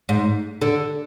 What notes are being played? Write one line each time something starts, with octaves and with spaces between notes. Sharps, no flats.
G#2
D3